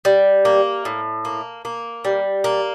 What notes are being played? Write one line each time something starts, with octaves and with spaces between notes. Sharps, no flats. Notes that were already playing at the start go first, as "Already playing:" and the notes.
G3
A#3
A2
A#3
A#3
G3
A#3